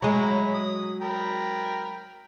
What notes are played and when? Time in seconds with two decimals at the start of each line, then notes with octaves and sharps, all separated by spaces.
0.02 F#3 G#3 E4 A#5 B5
0.54 D#6
1.01 A#4 G5 B5